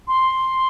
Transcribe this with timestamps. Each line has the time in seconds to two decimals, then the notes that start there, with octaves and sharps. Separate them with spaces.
0.08 C6